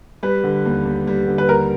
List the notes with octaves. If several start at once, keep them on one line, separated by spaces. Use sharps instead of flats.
G3 B4
D3
D#2
D#2
G3
D3
B4
D#2 A#4